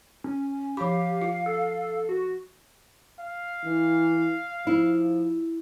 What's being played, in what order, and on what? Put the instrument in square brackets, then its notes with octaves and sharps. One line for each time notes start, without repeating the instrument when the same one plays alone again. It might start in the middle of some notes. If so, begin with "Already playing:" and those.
[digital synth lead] C#4
[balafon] F3 B5 [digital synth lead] G4 [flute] F5
[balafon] F4
[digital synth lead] A4
F#4
[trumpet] F5
[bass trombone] E3
[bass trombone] F3 [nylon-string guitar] E4